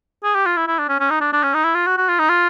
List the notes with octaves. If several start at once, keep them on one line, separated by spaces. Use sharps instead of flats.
G#4
G4
F4
E4
E4
D4
C#4
C#4
D#4
D4
D4
C#4
D#4
E4
F4
F#4
F#4
F4
D#4
F4